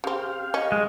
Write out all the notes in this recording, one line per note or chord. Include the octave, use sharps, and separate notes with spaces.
C#3 C4 G4 F5
C#4 D#5
G#3